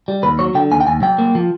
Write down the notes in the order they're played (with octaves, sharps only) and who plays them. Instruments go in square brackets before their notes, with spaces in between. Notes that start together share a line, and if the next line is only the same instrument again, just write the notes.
[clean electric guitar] G3
D#2 B4
F#3 C#5
D3 G5
D#2 G#5
G5
D#2 G#5
F#3 G5
A#3
F3